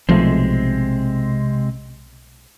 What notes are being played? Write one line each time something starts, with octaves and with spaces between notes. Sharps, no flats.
B1 C3 F3 G#3 A3 C4